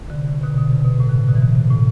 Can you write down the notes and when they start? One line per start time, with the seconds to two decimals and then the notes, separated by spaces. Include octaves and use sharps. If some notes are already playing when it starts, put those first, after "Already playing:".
0.10 D3
0.15 C3
0.30 C3
0.43 B2 D3
0.57 B2 D3
0.71 C3
0.85 B2
1.00 A2
1.09 D3
1.14 C3
1.28 B2 D3
1.36 E3
1.41 B2 D3
1.56 C3
1.70 A2